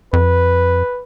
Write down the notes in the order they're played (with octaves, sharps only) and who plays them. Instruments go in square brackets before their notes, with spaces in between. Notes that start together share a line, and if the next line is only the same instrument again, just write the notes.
[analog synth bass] F2 [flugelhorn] B4